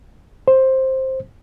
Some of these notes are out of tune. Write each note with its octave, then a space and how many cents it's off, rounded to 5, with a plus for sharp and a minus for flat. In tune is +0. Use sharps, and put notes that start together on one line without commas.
C5 +10